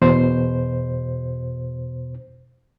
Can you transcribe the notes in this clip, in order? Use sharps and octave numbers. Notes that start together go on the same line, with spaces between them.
E2 B2 C5